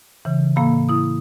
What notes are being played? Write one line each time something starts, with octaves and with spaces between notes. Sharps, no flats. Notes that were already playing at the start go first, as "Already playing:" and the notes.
C#3 E3
A2 A#3 F5 B5 E6
E4 D#6